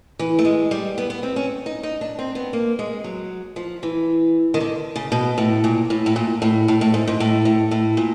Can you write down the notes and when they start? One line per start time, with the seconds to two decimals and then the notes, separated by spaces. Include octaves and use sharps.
0.19 E3
0.39 A3
0.45 G#3
0.71 G3
0.98 B3
1.10 B3
1.23 C4
1.36 C#4
1.66 D#4
1.83 D#4
2.01 D4
2.19 C4
2.35 B3
2.53 A#3
2.79 G#3
3.04 F#3
3.56 F3
3.83 E3
4.54 D#3
4.60 D3
4.96 C#3
5.12 B2
5.38 A2
5.64 A#2
5.90 A2
6.06 A2
6.16 A#2
6.42 A2
6.68 A2
6.81 A2
6.94 G#2
7.07 G#2
7.20 A2
7.45 A2
7.71 A2
7.97 A#2